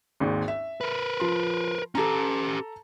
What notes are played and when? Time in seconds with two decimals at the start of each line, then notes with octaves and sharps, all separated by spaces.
0.20 G#1 D#2 G#2
0.48 E5
0.81 A#4 B4
1.20 F3 C6
1.95 C#4 G4 A4 A5 A#5